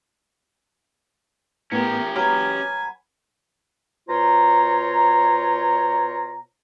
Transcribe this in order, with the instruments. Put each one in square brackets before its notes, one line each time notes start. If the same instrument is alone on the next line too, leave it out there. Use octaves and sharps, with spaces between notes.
[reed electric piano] A2 B3 G#5 [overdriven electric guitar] C#4 G4 [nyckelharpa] A#4
[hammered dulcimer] F#3 B4 [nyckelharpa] G#5 [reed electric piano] B5 D6 F6
[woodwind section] B2 F4 C5 C#5 A#5